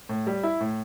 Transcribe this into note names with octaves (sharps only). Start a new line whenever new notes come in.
A2
G3
E4
A2